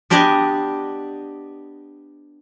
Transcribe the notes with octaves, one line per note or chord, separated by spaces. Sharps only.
B3 D4 G4 D5 D#5 G#5